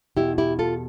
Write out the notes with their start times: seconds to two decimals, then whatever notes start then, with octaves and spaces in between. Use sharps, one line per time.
0.17 E2 B2 E4 G4
0.38 E4 G4
0.59 F4 A4